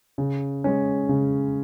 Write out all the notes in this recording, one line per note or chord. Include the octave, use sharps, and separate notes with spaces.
C#3
G#3 C#4
C#3